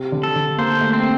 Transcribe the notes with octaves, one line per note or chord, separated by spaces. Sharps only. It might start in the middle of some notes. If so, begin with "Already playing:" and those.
Already playing: C3
D3
A4
D3
A#3 C5
A3
C4